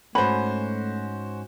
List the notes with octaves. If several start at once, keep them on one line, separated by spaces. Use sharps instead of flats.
G#2 A3 C#4 F#4 C5 B5